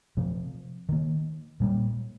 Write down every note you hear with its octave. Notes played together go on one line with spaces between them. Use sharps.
C3 F3 C4
D#3 A#3
A#2 G3 A#3